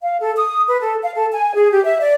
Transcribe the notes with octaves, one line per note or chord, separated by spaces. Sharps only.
F5
A4
D#6
B4
A4
F5
A4
G#5
G#4
G4
E5
D5